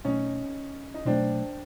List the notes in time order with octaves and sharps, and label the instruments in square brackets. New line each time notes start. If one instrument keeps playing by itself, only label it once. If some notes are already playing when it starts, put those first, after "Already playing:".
[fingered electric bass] B2 F#3 A3 C4 [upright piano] C#4 D#4
[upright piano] D#4
[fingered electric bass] B2 F#3 A3 [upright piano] C4 D4